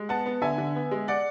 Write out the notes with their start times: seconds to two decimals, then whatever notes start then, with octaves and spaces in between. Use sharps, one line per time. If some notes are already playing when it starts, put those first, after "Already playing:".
Already playing: G#3
0.09 B3 F#5 A5
0.26 B3
0.42 D3 E5 G#5
0.58 D3
0.76 B3
0.91 G#3
1.08 D5 F#5